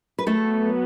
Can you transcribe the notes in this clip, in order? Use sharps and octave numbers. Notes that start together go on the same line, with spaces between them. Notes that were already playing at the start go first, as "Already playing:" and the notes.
B4
F#3 A3 B3 F#4 A4